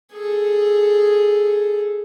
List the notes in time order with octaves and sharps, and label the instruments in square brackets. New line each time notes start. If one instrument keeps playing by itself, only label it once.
[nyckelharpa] G#4 A4